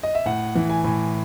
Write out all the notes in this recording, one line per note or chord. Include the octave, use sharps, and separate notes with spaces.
D#5
E5
A2 F#5
E3
G#5
A2